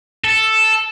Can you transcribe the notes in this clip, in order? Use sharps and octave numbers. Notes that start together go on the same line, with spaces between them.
A4